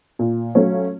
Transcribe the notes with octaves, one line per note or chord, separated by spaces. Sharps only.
A#2
F#3 A3 C#4 F4